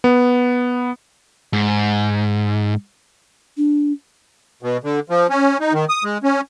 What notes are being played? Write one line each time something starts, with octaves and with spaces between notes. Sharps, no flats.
B3
G#2
D4
B2
D3
F3
C#4
D#4
D#3
D#6
G#3
C#4